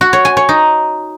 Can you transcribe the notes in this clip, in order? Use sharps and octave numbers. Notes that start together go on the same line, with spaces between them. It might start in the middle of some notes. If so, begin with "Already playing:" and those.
F#4
C#5
G#5
C#5
D#4